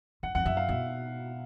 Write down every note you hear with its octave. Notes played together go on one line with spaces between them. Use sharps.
F#2 F#5
F2 F#5
F#2 E5
F5
B2 E5